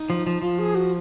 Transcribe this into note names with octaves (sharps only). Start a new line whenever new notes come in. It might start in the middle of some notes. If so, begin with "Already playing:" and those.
Already playing: D#4
F3
F3
F3 F4
G#4
F#4